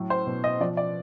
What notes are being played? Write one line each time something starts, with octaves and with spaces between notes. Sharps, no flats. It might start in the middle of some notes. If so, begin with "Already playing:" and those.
Already playing: A2 F#3
C5
B2
D#5
F3 D5
D5